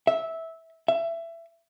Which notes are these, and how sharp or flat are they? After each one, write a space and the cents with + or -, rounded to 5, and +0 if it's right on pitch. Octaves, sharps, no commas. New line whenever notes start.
E5 -15
E5 +20